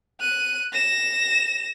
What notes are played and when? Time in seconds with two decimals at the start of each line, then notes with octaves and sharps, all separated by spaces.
0.21 F#6 D#7
0.73 A#6 E7